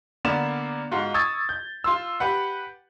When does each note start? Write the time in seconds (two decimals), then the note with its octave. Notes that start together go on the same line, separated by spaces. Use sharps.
0.25 D3 A#3 B3 D5 E7
0.91 G#2 F4 F#4
1.14 C#6 D#6 E6 G#6 A6
1.49 G6
1.84 F4 C6 E6
2.20 G4 B4 F#5